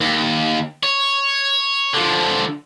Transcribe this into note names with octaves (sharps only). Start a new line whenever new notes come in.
D#2
C#5
D3 F3